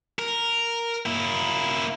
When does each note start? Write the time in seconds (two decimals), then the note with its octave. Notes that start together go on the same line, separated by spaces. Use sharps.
0.19 A#4
1.06 A#3 E4